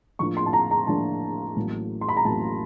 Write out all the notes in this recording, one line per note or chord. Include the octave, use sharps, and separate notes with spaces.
A2 F3 A#3 D4 F4 C#6
C6
A5
A#5
A#5
A2 F3 A#3 D4 F4 A5
A1 A2 F#3 A#3
C6
B5
A#5
A1 A2 F#3 A#3 A5